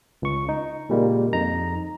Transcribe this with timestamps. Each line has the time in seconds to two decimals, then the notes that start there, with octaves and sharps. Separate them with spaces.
0.22 C#2 C#6
0.49 D#4
0.89 A#2 C#3 G3 G#3 A#3
1.33 F2 D#4 A#5